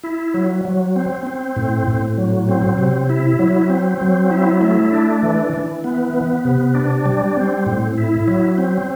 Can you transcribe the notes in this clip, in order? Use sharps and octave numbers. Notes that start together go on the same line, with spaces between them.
E4
F#3
F#3
C4
C4
A2
A2
F#3
C4
C3
E4
F#3
C4
F#3
E4
A3
D4
E3
E3
B3
B3
C3
D4
G3
C4
A2
E4
F#3
C4